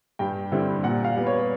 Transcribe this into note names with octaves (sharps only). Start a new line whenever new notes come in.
G2 G5
D3 G3 C4 E4
A#2 F#5
F5
G3 B3
C#5